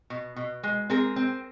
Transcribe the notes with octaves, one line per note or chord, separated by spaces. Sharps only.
B2
B2
G#3
C4 G#4 A#4
C4